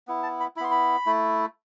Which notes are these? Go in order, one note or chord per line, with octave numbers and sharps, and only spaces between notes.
B3 E4
A5
B5
B3 E4 B5 C6
B5
A3 E4